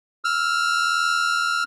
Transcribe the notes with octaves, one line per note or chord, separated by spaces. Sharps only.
E6 F6